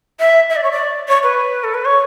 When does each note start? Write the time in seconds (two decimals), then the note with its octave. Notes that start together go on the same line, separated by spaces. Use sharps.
0.20 E5
0.50 E5
0.56 D5
0.64 C#5
0.71 D5
1.08 C#5
1.23 B4
1.64 A4
1.74 B4
1.85 C#5